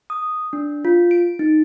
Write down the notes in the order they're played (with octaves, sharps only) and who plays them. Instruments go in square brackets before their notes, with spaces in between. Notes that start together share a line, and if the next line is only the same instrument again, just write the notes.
[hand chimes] D#6
D4
F4
D7
D#4